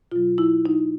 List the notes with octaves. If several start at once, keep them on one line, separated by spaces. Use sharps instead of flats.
B2 F#3 F4
E4
D#4